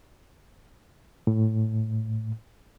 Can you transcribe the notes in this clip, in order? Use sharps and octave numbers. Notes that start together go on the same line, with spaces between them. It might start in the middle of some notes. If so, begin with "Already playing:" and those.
A2